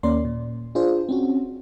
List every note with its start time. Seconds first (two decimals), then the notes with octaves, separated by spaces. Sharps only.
0.03 D#2 A#3 C#4 A#4 D5 C6
0.25 A#2
0.75 D4 F4 G#4 C5
1.09 C4 C#4 F#4